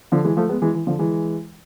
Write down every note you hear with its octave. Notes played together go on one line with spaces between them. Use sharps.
D3 F3
E3 G#3
F3 A3
G#3 B3
E3 G#3
E3
D3 F3
E3 G#3